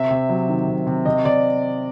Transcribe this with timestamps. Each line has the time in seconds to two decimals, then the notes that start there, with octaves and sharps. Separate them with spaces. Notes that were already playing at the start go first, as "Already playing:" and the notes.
Already playing: C3 E5
0.11 C3
0.29 F#3
0.49 D#3
0.68 C3
0.87 C3
1.05 C3 D#5
1.25 C3 D5